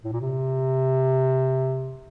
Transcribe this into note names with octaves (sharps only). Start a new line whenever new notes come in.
A2
A#2
C3